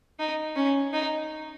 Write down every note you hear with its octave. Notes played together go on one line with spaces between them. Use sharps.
D#4
C#4
D#4